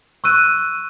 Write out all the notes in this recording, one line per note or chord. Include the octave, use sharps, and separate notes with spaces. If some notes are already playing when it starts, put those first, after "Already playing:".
C#6 E6 F#6 D#7